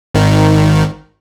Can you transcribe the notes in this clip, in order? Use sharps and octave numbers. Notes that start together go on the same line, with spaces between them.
G#1 D#3